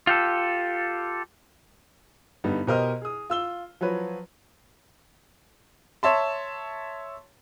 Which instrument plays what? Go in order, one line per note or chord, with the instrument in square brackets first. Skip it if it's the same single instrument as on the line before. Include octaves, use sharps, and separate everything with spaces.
[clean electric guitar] F4 G4 A4
[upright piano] G2 D3 G3 B3 D#4
B2 G4 A#4 C5 D#5 F6
G#4 D#6
F4 E6 G7
F3 F#3 F#4 B4 C#5
C#5 E5 A5 C6